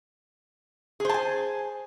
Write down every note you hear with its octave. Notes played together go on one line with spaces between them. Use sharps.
G#4 C5 G#5 A5